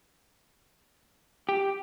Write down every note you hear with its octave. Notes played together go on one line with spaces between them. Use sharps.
G4